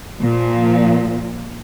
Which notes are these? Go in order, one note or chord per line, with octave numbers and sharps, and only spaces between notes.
A#2 F3